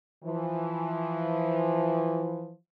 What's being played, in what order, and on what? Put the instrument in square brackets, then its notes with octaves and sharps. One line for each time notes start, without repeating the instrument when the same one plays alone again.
[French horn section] E3 F3